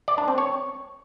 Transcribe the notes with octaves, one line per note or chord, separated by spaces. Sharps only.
D5
D4
C4
C#5